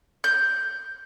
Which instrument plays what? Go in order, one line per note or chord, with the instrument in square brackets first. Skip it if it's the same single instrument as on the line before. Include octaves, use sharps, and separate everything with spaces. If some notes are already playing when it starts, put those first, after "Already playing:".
[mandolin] G6